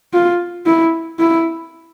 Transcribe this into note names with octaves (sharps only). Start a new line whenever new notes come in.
F4
E4
E4